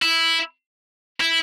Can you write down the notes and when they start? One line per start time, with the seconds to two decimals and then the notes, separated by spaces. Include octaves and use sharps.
0.02 E4
1.20 E4